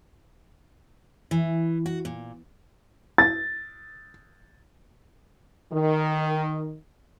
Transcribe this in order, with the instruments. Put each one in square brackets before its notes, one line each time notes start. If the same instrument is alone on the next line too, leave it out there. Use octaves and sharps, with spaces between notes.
[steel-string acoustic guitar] E3
F#4
A#2
[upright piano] A6
[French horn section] D#3